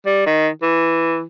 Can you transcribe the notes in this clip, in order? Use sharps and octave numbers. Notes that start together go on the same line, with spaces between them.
G3
D#3
E3